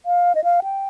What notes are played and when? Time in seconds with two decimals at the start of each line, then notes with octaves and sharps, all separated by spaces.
0.06 F5
0.35 D#5
0.44 F5
0.63 G5